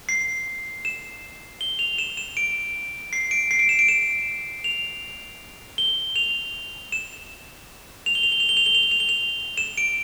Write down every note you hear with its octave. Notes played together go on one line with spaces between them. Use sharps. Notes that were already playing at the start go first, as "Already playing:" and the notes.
C7
E7
G7
F7
E7
E7
D7
C7
D7
C7
D7
E7
D7
E7
F7
G7
F7
E7
F7
G7
F7
G7
F7
G7
F7
G7
F7
G7
F7
G7
F7
E7
D7